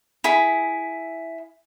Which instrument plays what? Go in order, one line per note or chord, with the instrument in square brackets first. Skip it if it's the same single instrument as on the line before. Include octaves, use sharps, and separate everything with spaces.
[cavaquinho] E4 G#4 B5